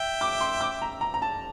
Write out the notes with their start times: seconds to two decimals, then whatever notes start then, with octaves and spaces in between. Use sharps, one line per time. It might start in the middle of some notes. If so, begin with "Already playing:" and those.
Already playing: E5 G5
0.21 D6
0.41 C6
0.61 D6
0.82 A#5
1.01 A#5
1.14 A#5
1.22 A5